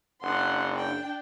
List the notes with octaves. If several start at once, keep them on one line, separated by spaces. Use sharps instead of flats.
F#1 D4 F#5 C6
G5